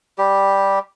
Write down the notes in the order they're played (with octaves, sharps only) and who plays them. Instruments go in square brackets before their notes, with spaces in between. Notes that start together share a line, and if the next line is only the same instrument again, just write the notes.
[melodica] G3 G4